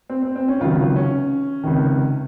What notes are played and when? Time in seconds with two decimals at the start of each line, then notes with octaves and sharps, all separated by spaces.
0.09 C4
0.22 C4
0.36 C4
0.48 C#4
0.61 C#2 C3 D#3 F#3 F4
0.96 C#4
1.64 C#2 C3 D#3